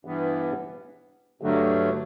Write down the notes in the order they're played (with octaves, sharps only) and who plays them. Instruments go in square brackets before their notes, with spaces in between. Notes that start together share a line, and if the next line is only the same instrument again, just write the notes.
[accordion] G2 E3 B3
G2 D3 F#3 A3